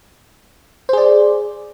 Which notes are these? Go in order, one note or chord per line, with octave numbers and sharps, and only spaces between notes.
G#4 C5 D5